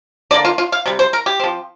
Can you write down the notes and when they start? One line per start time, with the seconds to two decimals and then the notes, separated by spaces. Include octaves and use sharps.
0.31 D3 D5
0.34 A#3
0.45 F4
0.58 F4
0.72 F5
0.86 C3 G3
0.99 C5
1.13 A#4
1.26 G4
1.40 F3 C4